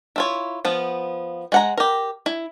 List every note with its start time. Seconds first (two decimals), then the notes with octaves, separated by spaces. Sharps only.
0.16 E4 F4 C#5
0.65 F3 B3 F5
1.52 G#3 F#5 A#5
1.77 G4 A#4
2.26 E4